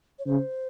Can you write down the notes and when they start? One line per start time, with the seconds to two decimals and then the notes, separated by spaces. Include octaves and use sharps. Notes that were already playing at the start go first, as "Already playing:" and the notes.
0.19 C#5
0.26 C#3 C5